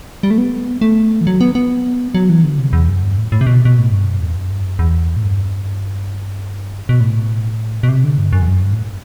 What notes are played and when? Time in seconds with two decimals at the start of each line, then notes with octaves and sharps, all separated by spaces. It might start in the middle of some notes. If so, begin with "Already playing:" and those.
0.23 G3
0.31 A3
0.38 B3
0.81 A3
1.21 E3
1.27 F#3
1.41 B3
1.55 B3
2.15 F#3
2.29 E3
2.44 D3
2.58 C3
2.73 E2
2.88 F#2
3.02 G2
3.18 A2
3.32 A2
3.41 C3
3.47 B2
3.65 B2
3.79 A2
3.92 G2
4.06 F#2
4.20 E2
4.36 F#2
4.50 G2
4.65 F#2
4.79 E2
5.17 A2
5.23 G2
6.89 B2
7.00 A2
7.83 B2
7.89 C3
8.04 D3
8.18 G2
8.33 F#2
8.42 E2
8.48 F#2
8.62 G2
8.72 A2